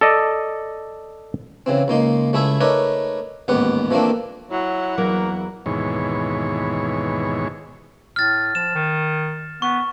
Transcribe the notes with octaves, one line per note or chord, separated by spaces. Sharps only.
A4 D5 D#5
C#3 E3 C4
C#2 A#3 D#4 C6
C#2 A3 E4 G#4 E5
A3 D#4 A#4 B4 C#5 D5
A1 D#2 G#2 B3 G4 F#5
E3 F3 A3 A#3 C4 D4
F#3 E4 F#5
E2 F#3 A#3 A#4
D#2 G#2 B2 E3 C#5
A2 F6 A6
F3 E7
D#3
B3 C#6